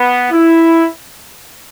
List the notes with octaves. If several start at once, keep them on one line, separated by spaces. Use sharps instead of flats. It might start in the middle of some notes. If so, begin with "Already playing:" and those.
Already playing: B3
E4